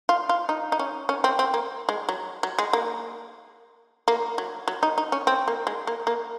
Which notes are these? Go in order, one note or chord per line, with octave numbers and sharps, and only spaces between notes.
F4
F4
D#4
D#4
C#4
C#4
C4
C4
A#3
G#3
F#3
F#3
G#3
A#3
A#3
F#3
F#3
D#4
D#4
C#4
C4
A#3
G#3
A#3
A#3